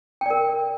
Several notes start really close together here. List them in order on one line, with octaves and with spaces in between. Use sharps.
G5 D5 A#4